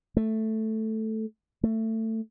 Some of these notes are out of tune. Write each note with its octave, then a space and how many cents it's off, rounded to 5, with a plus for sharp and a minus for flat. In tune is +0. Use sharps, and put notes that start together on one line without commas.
A3 +0
A3 +20